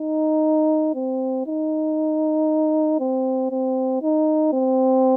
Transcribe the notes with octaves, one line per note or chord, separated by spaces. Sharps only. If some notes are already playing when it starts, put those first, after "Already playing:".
Already playing: D#4
C4
D#4
C4
C4
D#4
C4